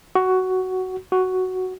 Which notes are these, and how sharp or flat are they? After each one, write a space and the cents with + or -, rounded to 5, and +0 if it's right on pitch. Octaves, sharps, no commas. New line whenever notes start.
F#4 +10
F#4 +5